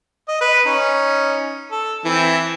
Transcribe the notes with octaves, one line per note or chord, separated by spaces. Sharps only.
D#5
B4
C#4 D#4
A4
E3 C4 E4